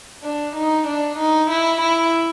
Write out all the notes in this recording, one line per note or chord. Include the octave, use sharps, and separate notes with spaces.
D4
D#4
D4
D#4
E4
E4